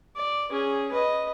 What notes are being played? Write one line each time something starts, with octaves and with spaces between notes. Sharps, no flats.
D5
C#4 G#4
B4 D#5